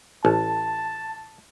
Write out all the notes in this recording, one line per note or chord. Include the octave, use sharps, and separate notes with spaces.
A1 A5